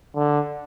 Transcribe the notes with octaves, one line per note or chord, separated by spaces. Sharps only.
D3